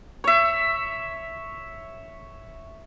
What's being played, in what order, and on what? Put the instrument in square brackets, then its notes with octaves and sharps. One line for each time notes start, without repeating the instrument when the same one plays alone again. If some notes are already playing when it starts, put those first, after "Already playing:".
[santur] C#5 E5